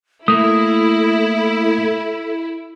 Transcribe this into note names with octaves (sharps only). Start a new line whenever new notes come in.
A3 A#3 E4 A4 A#4 D#6